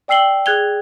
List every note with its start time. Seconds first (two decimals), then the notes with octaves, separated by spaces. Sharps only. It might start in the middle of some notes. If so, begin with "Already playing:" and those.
0.08 D5 G5 E6 C7 F#7 G7
0.46 G#4 F#6 G#6 F7 G7